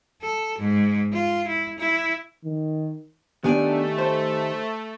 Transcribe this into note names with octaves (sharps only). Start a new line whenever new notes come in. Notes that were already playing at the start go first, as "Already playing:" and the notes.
A4
G#2
F4
E4
E4
D#3
D#3 A3 B3 D4 G4 D5 G#5
C5